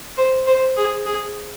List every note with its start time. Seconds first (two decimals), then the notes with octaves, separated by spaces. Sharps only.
0.17 C5
0.47 C5
0.77 G#4
1.06 G#4